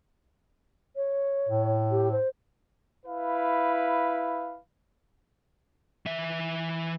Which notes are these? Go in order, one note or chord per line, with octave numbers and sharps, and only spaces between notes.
C#5
A2
G4
C5
E4 B4 F5
E3 E5